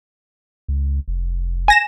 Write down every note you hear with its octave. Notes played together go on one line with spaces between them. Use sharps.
C#2
F1
G#5 A#6 E7